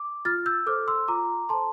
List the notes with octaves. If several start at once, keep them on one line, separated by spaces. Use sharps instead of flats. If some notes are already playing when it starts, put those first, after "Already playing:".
Already playing: D6
F4 F6 A6
E6 G6
A4 C5 D6 F6
C6 E6
F4 A#5 D6
A4 C5 A5 C6